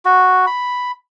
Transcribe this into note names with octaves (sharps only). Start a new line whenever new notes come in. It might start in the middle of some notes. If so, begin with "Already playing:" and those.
F#4
B5